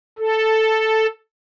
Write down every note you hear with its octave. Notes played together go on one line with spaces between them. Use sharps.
A4